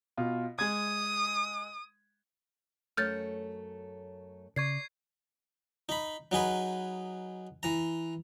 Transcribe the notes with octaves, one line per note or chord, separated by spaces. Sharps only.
B2 F4
G#3 D#6 G#6
F#2 A3 C#5 F6 G6 A6
C#3 D5 C#6 G#6 C7
D#4 B5
F#3 D#4 G#4 B4
E3 A#5